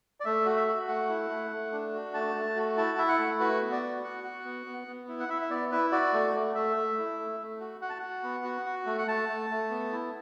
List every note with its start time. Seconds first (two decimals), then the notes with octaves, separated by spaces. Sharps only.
0.20 D5
0.25 A3 E5
0.46 F#4
0.57 E5
0.68 F#4
0.88 A3 F#5
1.09 E4
1.30 A3
1.51 A3
1.72 D4
1.94 F#4
2.14 A3 A5
2.35 A3
2.56 F#4
2.77 E4 A5
2.98 E4 E5
3.08 F#5
3.19 A3
3.40 F#4 B4
3.62 B3
3.72 D5
3.82 F#4
4.03 F#4 F#5
4.24 F#4
4.45 B3
4.66 B3
4.87 B3
5.08 E4
5.20 F#5
5.29 E4 E5
5.42 E5
5.50 B3 D5
5.72 E4 B4
5.92 F#4 D5
6.13 A3
6.34 A3
6.55 A3 E5
6.76 A3
6.98 E4
7.19 A3
7.40 A3
7.60 F#4
7.81 F#4 F#5
7.90 A5
7.99 F#4 F#5
8.23 B3
8.44 F#4
8.66 F#4
8.86 A3
8.98 F#5
9.08 A3 A5
9.29 A3
9.50 A3
9.70 B3
9.92 E4